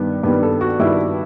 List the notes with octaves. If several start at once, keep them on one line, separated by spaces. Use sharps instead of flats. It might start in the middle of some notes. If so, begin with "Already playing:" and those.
Already playing: G2 D#3 G3 B3
G2 D#3 G3 B3
A4
F#4
G2 D#3 G3 E4